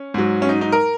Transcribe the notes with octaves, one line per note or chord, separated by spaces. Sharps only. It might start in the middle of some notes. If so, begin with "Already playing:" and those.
Already playing: C#4
G#2 F#3
C#4
D#4
D#4
A#4